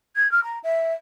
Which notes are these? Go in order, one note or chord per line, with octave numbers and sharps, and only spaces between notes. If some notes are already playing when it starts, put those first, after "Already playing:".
G#6
F6
A#5
E5